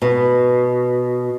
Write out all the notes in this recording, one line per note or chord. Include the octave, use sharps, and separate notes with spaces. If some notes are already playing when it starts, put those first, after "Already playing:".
B2